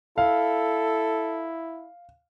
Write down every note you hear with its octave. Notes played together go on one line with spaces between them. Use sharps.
E4 A4 F5